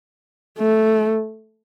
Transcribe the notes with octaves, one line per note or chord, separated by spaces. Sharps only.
A3